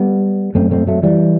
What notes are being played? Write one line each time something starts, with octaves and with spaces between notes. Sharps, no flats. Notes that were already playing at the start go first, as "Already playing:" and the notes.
Already playing: G3 B3
F#2 A3 C4
A3 C4
F#3 A3
E3 G3